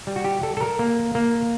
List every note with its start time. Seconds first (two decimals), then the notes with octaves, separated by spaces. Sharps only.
0.07 G3
0.16 F#4
0.24 G4
0.42 G3 A4
0.57 A4
0.61 A#4
0.79 A#3
1.15 A#3